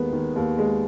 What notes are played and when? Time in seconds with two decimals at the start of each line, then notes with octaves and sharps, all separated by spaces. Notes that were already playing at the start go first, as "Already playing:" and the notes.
Already playing: D#2 D#3 G#3 B3
0.12 D#3
0.36 D#2
0.58 G#3